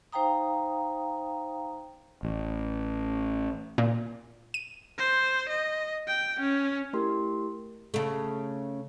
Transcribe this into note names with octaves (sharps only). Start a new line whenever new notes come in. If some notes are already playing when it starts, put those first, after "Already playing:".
D#4 C5 F5 G5 A#5 D#6
A1
A#2
D#7
C5
D#5
G5
C#4
A3 E4 G4 A#4 C6
C#3 A3